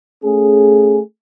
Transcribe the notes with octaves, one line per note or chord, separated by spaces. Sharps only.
A3 C#4 G#4